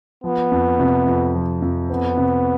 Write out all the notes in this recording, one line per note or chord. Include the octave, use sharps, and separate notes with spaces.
F3 B3
F2
C3
F2
F3
F2
B3 C4
C3